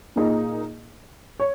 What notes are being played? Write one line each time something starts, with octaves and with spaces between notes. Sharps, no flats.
A#2 A#3 D#4 G#4 D#5
C#5